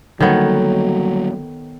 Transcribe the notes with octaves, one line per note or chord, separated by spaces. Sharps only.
D3 D#3 F#3 G3 A#3 B3 A4 C#5